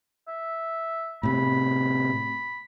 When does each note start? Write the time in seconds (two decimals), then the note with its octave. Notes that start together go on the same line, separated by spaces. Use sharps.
0.28 E5
1.23 A2 C3 B5